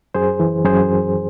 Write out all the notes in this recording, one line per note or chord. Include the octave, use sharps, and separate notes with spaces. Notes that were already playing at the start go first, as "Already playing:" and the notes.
F#2 G#4 C5
E3
F#2 G#4 C5